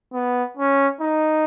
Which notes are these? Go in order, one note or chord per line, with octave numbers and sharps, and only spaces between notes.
B3
C#4
D#4